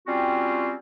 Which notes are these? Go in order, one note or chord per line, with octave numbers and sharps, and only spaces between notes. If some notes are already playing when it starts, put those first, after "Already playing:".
G3 C4 C#4 F4 F#4